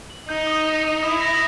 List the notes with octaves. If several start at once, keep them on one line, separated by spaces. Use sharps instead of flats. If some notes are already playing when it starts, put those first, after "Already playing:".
F#7
D#4 G6
D#6
G6
D#6
E4 D#6
A#6